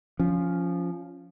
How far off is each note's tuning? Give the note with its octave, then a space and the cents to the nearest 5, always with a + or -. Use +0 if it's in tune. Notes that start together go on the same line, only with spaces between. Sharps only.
F3 +0 C#4 +15